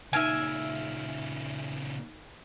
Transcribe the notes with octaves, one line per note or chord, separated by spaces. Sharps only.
A#2 C#3 D#4 E5 G#5 F6 D7